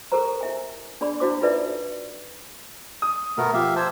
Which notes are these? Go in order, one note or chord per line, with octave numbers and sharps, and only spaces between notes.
G4 A4 A#4 C5 A#5
E4 E5 G#5
D4 G#4 D5 B5
D4 E4 F#4 C5 D6
D#4 F4 A4 B4 D5 E5
D#6
B2 A3 B3 A#4
F3 G4 E5 F5
C5 A5 E6 G#6